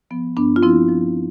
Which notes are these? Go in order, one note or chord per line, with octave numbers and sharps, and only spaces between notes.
F3 B3
G2 B3 D4
F4
F3 C4 E4
F3